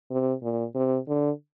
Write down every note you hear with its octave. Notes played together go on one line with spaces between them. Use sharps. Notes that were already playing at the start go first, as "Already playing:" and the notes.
C3
A#2
C3
D3